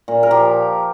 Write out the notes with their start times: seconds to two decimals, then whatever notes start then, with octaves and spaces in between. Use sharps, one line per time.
0.08 A#2
0.23 A#4
0.31 F3 G4